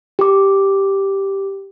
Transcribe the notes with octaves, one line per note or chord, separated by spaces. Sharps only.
G4 D6